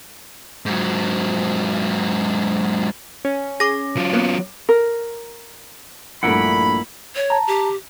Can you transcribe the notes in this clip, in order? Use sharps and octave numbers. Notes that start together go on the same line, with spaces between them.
G#2 F#3
C#4
G#4 D6 A#6
F#3 F4
A#3 B3
A#4
A#1 G2 A3 A#3 E4 F#5 B5
C#5
A5 A#5
G4